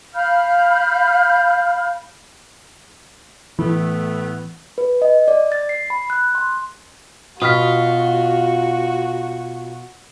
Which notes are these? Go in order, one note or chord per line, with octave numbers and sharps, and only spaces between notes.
F5 B5 F6 G6
A2 E3 A3 B3
B4
D#5
D5
A6
C7
B5
F#6
C6
B2 F4 F#4 D#6 F6 B6